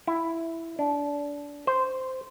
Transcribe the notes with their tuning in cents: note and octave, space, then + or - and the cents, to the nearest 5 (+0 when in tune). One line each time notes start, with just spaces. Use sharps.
E4 +5
D4 -20
C5 -10